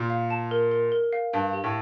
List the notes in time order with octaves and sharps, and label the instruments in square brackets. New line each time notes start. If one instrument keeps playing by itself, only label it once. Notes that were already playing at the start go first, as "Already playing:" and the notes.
Already playing: [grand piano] A#2
[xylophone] F5
A5
A#4
A#4
A#4
F5
[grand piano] G2 [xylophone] F5
[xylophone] G4
[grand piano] A2